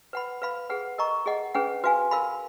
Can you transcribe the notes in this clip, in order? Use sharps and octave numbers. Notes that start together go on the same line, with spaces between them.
B4 F#5 B5
B4 F5 B5
G#4 B4 F#5
A#4 D#5 A#5 C#6
G#4 D#5 F#5
C#4 G#4 B4 F#5
F#4 B4 F5 G#5
A#4 F5 B5